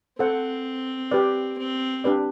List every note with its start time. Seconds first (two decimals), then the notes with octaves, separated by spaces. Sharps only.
0.18 C4 A4 C5 F#5
1.11 G4 B4 D5
1.58 C4
2.04 D4 G4 B4 D5